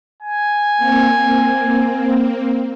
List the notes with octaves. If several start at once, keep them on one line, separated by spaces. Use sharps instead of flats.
G#5
A#3 C4